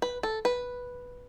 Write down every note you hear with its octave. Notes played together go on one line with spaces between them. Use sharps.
B4
A4
B4